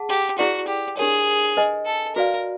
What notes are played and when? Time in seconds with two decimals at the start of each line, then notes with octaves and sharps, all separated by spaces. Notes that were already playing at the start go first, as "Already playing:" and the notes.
Already playing: G#4 F#5 A5
0.09 G4
0.38 E4 F#4 G#4 B4 D5 F#5
0.67 G4
0.97 D4 G4 G#4 A#4 C#5
1.57 B4 D#5 G#5
1.86 A4
2.15 F#4 A#4 B4 D5 F5